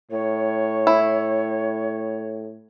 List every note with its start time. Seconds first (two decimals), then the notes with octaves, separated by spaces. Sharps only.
0.11 A2 C#5
0.87 E4